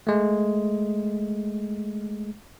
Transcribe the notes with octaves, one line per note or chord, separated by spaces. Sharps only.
G#3 A3